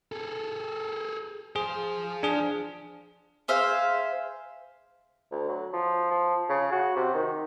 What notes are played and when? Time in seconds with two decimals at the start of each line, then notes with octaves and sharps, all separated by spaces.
0.12 G#4 A4
1.56 F3 G#4 C5
2.23 D4 G#4
3.48 G#4 C5 E5 F5
5.31 D2
5.49 F#3
5.74 F3
6.11 F3
6.49 C#3
6.72 F#4
6.96 C3
7.15 D#3